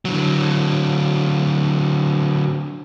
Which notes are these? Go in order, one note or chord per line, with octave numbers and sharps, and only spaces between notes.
D3 F#3